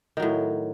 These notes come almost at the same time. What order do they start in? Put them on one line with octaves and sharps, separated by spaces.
D#3 F#3 A2